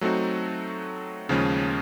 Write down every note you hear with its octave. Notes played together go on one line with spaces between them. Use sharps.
F#3 A3 C4 D#4 F#4
D#2 C#3 F3 G#3 C#4